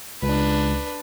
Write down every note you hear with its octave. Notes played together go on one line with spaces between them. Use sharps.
C#2 D4 B4